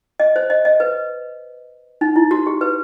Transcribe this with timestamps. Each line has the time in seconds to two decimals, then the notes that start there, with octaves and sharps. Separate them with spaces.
0.20 D#5
0.36 C5
0.50 D#5
0.65 D#5
0.80 B4
2.01 D#4
2.16 E4
2.31 F#4
2.47 G4
2.61 B4